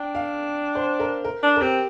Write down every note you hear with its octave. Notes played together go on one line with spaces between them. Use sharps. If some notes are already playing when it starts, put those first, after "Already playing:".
Already playing: D4 G5
F5
C5
A#4
A#4
D4
A#4
C4 G4